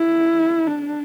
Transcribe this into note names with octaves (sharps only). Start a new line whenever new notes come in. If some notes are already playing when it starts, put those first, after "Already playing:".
Already playing: E4
D4